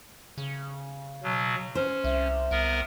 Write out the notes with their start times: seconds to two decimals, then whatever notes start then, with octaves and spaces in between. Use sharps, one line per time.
0.38 C#3
1.23 B2 F#3
1.75 C#4 C5
2.04 C2 E5
2.51 C2 B3 A#4